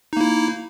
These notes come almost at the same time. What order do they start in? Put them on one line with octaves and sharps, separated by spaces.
D#4 A#3 E4